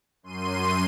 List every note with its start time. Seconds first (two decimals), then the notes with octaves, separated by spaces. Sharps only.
0.23 F#2 C6 D#7